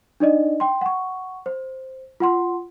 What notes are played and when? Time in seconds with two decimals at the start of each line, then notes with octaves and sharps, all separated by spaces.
0.20 D4 D#4 D5 D#5
0.60 G5 C6
0.81 F#5 C#6
1.46 C5
2.20 F4 F#5 C6